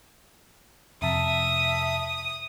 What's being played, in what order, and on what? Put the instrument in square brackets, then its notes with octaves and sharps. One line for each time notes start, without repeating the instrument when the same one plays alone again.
[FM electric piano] F2 C3 A5 [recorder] E5 [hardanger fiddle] D#6